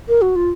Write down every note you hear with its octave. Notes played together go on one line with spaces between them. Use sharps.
A#4
F#4
F4